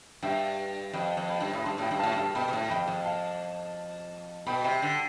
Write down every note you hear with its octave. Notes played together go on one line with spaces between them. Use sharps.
G2 E5 G5
F2 G5 B5
F2
G5 B5
G2
A2 B5
G2 A5 C6
A2 G5 B5
G2
A2 F5 A5
G2 F5 A5
B2 G5 B5
B2
A2
F2 G5 B5
F2
F5 A5
B2 G5 B5
C3 G5 B5
D3